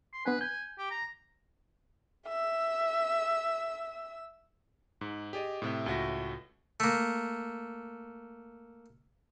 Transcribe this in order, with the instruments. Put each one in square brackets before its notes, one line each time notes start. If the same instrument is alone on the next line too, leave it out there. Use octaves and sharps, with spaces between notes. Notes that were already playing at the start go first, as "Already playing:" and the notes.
[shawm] C6
[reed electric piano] B3 D4 G#5 [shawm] B4
[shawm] G#5 [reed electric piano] G6
[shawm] G4
A#5
[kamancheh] E5 E6
[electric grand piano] G#2
G4 G#4 D5 D#5
A2 C3 E5
C#2 A2 F#4 E5 A#6
[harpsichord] A3 A#3